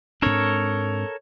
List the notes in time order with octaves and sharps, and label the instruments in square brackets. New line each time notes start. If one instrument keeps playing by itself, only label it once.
[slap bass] G#2 C4 D4 [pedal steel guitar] A4 A#4 C#5